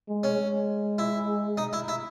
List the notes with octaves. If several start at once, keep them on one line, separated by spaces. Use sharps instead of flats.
G#3
C#4
G#3
E4
D#4
E4
E4